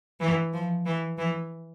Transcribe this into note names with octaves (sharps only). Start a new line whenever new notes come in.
E3
F3
E3
E3